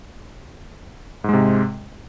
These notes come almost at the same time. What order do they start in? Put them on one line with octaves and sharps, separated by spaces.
G#2 G#3 C3